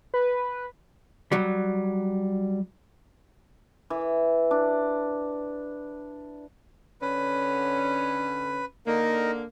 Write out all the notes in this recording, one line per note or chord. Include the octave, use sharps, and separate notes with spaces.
B4
F#3 G3
E3
D4
D3 C#4 B4
D3 A#3 D#4 A#4